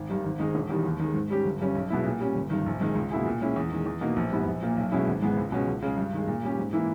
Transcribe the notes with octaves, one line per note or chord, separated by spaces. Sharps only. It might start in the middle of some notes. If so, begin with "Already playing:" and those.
Already playing: G#1
G2 D#3 G3
G#1
G#2 D#3 G#3 D#4
E1
E2 D#3 G3
D#2
D#3 G#3
G#2
G3 C#4 G4
G1
G2 G3 C#4
B1
B2 G#3 B3 E4
A#2
G3 C#4
G1
G2 D#3
A#1
G#2 D#3 G#3
C#2
B2 A#3 E4 G#4
A#2
G#3 C#4 E4
E2
D#3 G#3
E2
B2 A#3 D#4
A#1
G#2 G3 B3 E4
A#1
A#2 A#3
B1
B2 G#3 C#4 E4
G#1
G#2 E3 G#3 B3
C#2
B2 G#3 C#4
C#2
C#3 G#3
G2
D#3 G#3
A#2
G3 C#4 G4
G#2
E3 A#3 E4